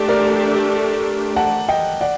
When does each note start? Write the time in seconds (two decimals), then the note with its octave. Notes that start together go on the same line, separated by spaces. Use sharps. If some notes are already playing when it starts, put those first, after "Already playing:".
Already playing: A3 D4 G4
0.08 A#4 D5
1.36 F#5 A5
1.68 D#5 G5
2.01 D5 F#5